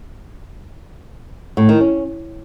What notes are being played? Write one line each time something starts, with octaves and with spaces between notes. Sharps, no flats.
A2
D#3
C#4